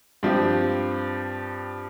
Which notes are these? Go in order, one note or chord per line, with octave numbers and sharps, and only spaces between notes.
G2 F3 C4 G4